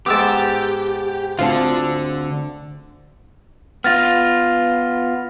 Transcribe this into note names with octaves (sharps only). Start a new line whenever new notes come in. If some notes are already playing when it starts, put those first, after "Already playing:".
G#2 B3 G4 D6 E6 A6
D2 D3 C4 F4 A5
B3 F4 F6 A6 A#6